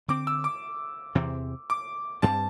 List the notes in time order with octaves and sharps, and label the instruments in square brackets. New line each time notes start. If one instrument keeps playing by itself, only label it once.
[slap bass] D3 C4 [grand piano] D6
[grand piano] E6
D6
[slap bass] E2 C3 E3 C4
[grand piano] D6
[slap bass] G2 G3 C4 [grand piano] A5